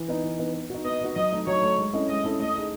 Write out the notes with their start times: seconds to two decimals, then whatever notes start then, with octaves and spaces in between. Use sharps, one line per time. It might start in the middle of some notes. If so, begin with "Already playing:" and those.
Already playing: E3
0.08 B3 D#4
0.23 E3
0.39 B3 D#4
0.54 B3
0.70 D#4 F#4
0.85 B3 D#5
1.01 D#4 F#4
1.16 F#3 D#5
1.31 A3 D#4
1.47 F#3 C#5
1.62 A3 D#4
1.78 G#3
1.93 C#4 E4 A4 D#5
2.08 G#3 D#5
2.24 C#4 E4 A4 D#5
2.40 A3 D#5
2.55 D#4 G#4